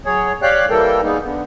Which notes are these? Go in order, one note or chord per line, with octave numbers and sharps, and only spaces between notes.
F#3 G#4 C#5
G4 C#5 D5 F5 G5 F#6
E3 G3 A#3 A4 A#4 G5
G3 G#3 A#3 B3 D#4
D3 B3